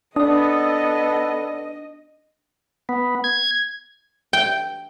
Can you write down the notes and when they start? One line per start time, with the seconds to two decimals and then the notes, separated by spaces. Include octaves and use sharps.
0.16 B3 D4 A4 D5 D#5 D#6
2.89 B3
3.24 G#6
4.33 G5